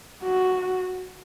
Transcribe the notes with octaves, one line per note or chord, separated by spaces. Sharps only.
F#4